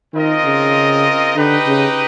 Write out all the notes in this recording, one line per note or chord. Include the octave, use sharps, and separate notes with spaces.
D#3 C4 F4 A#4 D#5
C#3
D3 D#4 G4 B4 D#5 G5
C#3